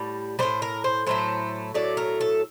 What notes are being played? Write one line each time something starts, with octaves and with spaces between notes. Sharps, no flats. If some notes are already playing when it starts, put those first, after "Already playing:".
Already playing: A2 G3
A2 G3 C5
A#4
C5
A2 F#3 A3 C5
A2 F#3 A3 D5
A#4
A4